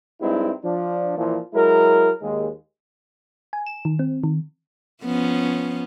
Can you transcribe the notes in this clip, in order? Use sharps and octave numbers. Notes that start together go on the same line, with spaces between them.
G2 G#3 C4 D#4 E4
F3 D4
A#2 E3 F3
F#3 G#3 E4 A#4
D#2 G#3
G#5
E7
D#3
C4
D#3
F3 B3 C#4